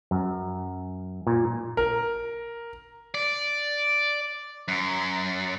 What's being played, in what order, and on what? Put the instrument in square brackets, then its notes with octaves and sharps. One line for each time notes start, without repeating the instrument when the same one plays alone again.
[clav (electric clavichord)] F#2
A#2
[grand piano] A#4
[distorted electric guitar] D5
F#2